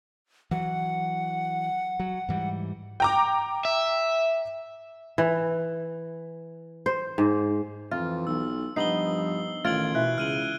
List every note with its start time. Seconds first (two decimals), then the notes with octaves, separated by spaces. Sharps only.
0.51 E3 F#3 F#5
2.00 F#3
2.29 G#2 E3 G3
3.00 G5 A#5 D6
3.65 E5
5.18 E3
6.86 C5
7.18 G#2
7.91 F2 E3 F4
8.27 B1 E6
8.76 G2 F3 B3 D#4 C7 F#7 G7
9.65 A1 D#3 F4 G#6 D7 F#7
9.95 B2 E3 F#6
10.18 C#2 C#3 F6 D#7 F#7